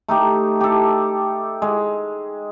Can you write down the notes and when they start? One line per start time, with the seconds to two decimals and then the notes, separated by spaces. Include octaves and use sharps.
0.08 A3 D#4 G4
0.61 G4 A4
1.62 G#3